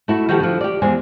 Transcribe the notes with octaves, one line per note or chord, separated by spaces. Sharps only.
A3 E4 F#4
D#3 F3 E4 F#4 G4 A4
D3 F3
G4 D5
E2 G#3 C5 G#5